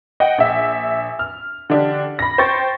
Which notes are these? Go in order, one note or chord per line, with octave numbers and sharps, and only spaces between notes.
D#5 F#5 G5
A#1 E5
F6
D3 D4 G4
B5 A#6
C5 G5 C#6 A6